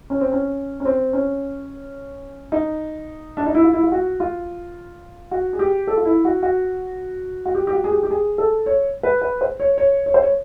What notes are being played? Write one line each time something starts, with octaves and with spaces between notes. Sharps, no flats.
C#4
C4
C#4
C#4
C4
C#4
D#4
D4
D#4
E4
F4
E4
F4
F#4
F4
F#4
G#4
G4
A4
F4
E4
F#4
F#4
F#4
G4
G4
F#4
G#4
G4
G4
G#4
A4
C#5
B4
B4
C5
C#5
C#5
C#5
C5
C#5